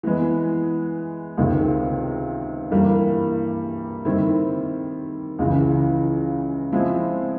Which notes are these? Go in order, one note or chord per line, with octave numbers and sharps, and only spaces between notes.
E3 G#3 B3
C#2 C3 D#3
G2 E3 G3 A#3
D#3 G3 C4 E4
C#2 C#3 E3
F3 G#3 C4 E4